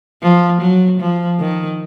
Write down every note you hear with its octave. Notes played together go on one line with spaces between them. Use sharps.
F3
F#3
F3
D#3